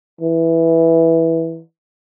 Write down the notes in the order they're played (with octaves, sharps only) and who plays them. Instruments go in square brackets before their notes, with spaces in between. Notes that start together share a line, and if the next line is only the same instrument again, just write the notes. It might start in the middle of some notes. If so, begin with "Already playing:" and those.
[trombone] E3